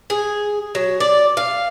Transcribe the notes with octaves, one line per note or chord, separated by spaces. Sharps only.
G#4
F#3
D5
F5